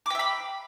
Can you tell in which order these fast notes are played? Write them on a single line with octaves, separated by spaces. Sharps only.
D6 G5 E5 B5